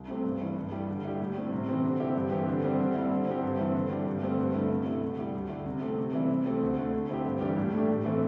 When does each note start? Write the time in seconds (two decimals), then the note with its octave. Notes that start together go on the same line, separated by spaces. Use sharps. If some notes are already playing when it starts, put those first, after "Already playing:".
Already playing: C2
0.08 C3 A3 C4 G4
0.24 G2
0.40 E3 G3 E4
0.57 G2
0.72 G3 E4 G4
0.88 D3
1.04 G3 E4 G4
1.20 A2
1.36 G3 C4
1.52 C3
1.68 E3 C4 G4
1.84 D3
2.00 C4 E4 G4
2.15 G2
2.31 E3 C4 G4
2.48 D3
2.64 G3 C4 G4
2.80 D3
2.95 G3 C4 E4
3.11 D3
3.27 C4 G4
3.43 G2
3.59 E3 C4 E4
3.74 D3
3.90 G3 D4 G4
4.06 G2
4.22 D3 A3 C4 G4
4.38 G2
4.54 D3 A3 E4
4.70 C3
4.86 A3 E4 G4
5.02 D3
5.18 G3 E4 G4
5.34 D2
5.49 D3 G3 E4 G4
5.66 C3
5.81 A3 C4 G4
5.98 C3
6.13 E3 G3 C4 E4
6.30 C3
6.46 A3 C4 G4
6.62 D2
6.77 D3 A3
6.93 D3
7.09 C4 E4 G4
7.25 G2
7.41 E3 G3 D4 G4
7.57 A2
7.72 A3 D4 G4
7.89 A2
8.05 E3 A3 C4 E4